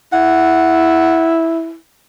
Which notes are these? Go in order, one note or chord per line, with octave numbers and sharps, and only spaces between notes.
E4 F#5